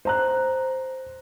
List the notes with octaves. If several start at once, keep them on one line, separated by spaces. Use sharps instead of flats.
C5 A#5 F#6